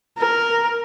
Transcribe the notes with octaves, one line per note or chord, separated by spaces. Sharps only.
A#4